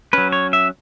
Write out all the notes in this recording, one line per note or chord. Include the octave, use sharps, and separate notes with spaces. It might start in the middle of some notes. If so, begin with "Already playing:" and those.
F#3 C#4 B4
C#5
E5